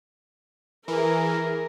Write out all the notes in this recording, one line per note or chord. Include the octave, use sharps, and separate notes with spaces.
E3 G#4 A#4